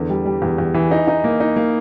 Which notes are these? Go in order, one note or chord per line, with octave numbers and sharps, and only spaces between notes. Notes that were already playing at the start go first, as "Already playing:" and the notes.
Already playing: E2 D3
G3
G3
E2
E2
E3
D#4
D#4
A#3
D#4
A#3